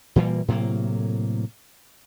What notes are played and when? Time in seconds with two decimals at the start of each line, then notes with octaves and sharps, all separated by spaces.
0.16 A#2 E3 G3 A#3
0.48 A2 C3 F#3 A#3